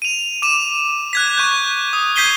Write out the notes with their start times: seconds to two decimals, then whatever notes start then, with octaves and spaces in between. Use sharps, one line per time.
0.02 D#7 F7
0.42 D6 D#7 E7
1.13 F#6 G#6 B6
1.38 C#6 G6
1.93 D#6
2.16 G6 G#6 B6 C7 D#7 G7